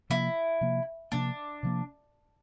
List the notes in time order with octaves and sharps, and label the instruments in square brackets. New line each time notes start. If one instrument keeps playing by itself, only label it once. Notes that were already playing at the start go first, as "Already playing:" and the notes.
[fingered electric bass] C3 F3 A#3 [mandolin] E4
[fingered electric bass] C3 F3 A#3
[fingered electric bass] C3 F3 A#3 [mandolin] D4
[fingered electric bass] C3 F3 A#3